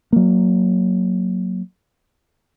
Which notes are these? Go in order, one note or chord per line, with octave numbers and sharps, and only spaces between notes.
F#3 A#3